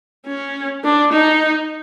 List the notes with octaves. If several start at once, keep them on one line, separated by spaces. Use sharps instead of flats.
C#4
D4
D#4